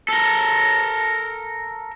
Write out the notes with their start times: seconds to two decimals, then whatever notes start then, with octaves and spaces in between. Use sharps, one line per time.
0.08 A4 A#4